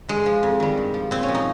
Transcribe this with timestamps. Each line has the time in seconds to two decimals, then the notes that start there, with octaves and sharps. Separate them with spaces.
0.08 G2 G#3
0.26 F3
0.43 F2
0.60 D#3 G3
0.77 G2
0.94 F3
1.11 A#2 C4
1.23 C#4
1.28 F3
1.35 D#4